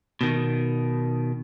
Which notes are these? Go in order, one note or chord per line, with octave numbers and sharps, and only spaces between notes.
B2 D#3